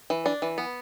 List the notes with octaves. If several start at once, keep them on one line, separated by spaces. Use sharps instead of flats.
E3
D4
E3
B3